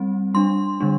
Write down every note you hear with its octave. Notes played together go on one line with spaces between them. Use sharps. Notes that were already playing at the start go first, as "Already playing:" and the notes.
Already playing: G3 C4
G3 D4 C6
D3 G3 D4